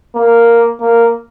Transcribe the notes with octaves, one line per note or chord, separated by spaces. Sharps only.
A#3
A#3